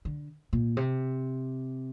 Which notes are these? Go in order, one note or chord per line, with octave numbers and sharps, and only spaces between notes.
D3
A#2
C3